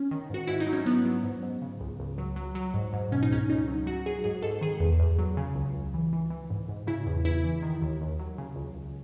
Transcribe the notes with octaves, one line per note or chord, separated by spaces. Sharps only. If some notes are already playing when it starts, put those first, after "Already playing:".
Already playing: C#4
D#3
G#2 F#4
G#2 E4
D#4
F#3
C#4
F#3 B3
F#3
G#2
G#2
C#3
C#2
C#2
F#3
F#3
F#3
G#2
G#2
B2 C#4
D#4
C#2 C#4
C#2 D#4
F#3
F#3 F#4
F#3 G#4
G#2 G#4
G#2 A4
D#3 G#4
E2
E2
F#3
C#3
C#2
C#2
E3
E3
E3
G#2
G#2
C#3 E4
E2
E2 E4
E3
D#3
D#2
D#2
F#3
C#3
C#2
C#2